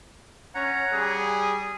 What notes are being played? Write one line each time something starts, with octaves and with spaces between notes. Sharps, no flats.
C#4 C#5 F#5 A#5
G3 G#4
D#6